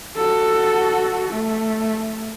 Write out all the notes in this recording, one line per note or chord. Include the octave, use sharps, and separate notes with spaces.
F#4 A4
A3